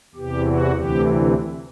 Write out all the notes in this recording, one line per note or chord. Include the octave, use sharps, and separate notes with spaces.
E2 C3 E3 G4
F#4
D2 C3 E3 G4